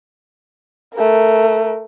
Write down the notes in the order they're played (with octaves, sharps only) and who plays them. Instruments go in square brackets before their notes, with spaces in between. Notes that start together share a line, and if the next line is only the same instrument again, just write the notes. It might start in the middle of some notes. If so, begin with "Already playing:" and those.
[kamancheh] A3 A#4